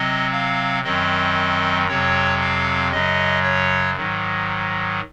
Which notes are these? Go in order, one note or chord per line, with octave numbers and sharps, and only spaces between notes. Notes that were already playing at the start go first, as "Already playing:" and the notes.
Already playing: C3 F#3 C4 D#5
F5
F#2 D#3 F#3 C4 D#5
F2 C3 F#3 C4 C#5
F5
F#2 C#3 F#3 D#5
C#5
G#2 D#3 F#3